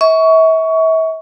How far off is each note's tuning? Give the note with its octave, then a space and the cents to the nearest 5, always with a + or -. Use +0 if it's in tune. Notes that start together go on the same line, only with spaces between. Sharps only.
E5 -40 C#6 +20